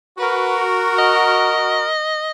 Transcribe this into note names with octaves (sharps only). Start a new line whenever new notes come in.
F#4 A#4 B4
D#5